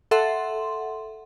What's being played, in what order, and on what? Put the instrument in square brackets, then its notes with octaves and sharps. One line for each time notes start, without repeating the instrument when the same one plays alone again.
[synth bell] A4 E5 F#5 C6